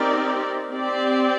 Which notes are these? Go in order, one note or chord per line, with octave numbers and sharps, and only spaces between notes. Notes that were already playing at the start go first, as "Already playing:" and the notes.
Already playing: C4 D#4 G4 A#4 D5
C4 G4 D5